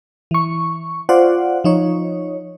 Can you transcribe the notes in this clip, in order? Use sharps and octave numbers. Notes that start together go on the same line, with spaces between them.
E3 C#6
F4 C5 D5 F#5
F3 D#4 C#5